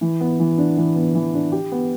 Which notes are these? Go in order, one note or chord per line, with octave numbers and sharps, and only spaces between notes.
E3
B3
E3
D4
E3
B3
E3
D4
G4
B3